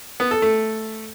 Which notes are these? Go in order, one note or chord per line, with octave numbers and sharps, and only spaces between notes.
B3
A4
A3